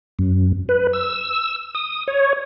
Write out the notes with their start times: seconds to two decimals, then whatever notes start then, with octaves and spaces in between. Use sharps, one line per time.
0.19 F#2
0.69 B4
0.93 E6
1.75 D#6
2.08 C#5